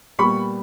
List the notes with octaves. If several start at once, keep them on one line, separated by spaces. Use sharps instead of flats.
A#2 G3 B3 B5 C#6